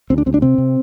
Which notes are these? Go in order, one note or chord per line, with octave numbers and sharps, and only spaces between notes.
D2 C4
D4
D2 C4
D4
C3 C4
C3